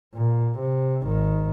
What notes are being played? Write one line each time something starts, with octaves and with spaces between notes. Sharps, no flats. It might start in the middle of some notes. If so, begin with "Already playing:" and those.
A#2
C3
G#1 D#3